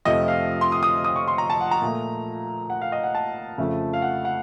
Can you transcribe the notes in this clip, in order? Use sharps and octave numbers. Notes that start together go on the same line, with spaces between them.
F2 C3 F3 A3 D#5
F5
C6
D#6
D#6
D#6
C#6
C6
A#5
A5
F#5
A#5
A#2 A3
F#5
F5
D#5
F#5
A5
F2 C#3 F3 A3
F5
F#5
F#5